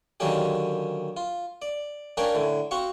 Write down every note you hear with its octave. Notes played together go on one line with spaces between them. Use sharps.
D3 D#3 F#3 A#3 C#4 G4
F4
D5
A#3 C#4 D4 A#4 C#5 G5
A2 D3
C4 F#4 F5 C#6